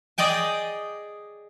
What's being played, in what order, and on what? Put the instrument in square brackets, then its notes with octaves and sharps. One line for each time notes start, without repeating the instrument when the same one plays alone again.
[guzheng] G#4 D5 D#5 G5 G#5